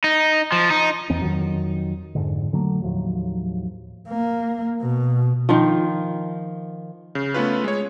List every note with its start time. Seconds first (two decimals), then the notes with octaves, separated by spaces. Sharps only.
0.04 D#4
0.52 F3
0.70 D#4
1.10 E2 E3 C4
1.21 F2 D#3 F#3
2.15 F2 G#2 D3
2.53 D3 F#3 A3 A#3
2.82 D#2 A2 F3 F#3
4.09 A#3
4.82 B2
5.49 D#3 F3
7.15 C#3
7.34 A3 B3 C#4 F4 B4
7.64 G#3 C#5